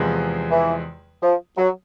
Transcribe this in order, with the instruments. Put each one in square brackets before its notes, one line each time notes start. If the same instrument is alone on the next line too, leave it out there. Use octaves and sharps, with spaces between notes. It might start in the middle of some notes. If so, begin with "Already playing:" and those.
Already playing: [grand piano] E2 C3 F3 G#3 B3
[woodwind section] E3
F3
F#3